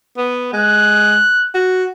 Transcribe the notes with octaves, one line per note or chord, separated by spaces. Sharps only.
B3
G#3 F#6
F#4